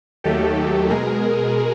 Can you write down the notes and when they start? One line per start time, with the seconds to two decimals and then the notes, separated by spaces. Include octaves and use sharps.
0.24 D#2 D#3 F#3 A3 G4 A4
0.90 B2 G#3 G#4 A#4